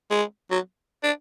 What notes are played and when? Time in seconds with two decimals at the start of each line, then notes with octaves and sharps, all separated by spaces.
0.11 G#3
0.51 F#3
1.03 D4